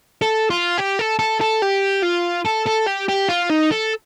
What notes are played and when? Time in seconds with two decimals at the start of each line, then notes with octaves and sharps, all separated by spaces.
0.22 A4
0.50 F4
0.78 G4
0.99 A4
1.19 A4
1.41 A4
1.62 G4
2.03 F4
2.46 A4
2.67 A4
2.87 G4
3.09 G4
3.29 F4
3.50 D#4
3.71 A4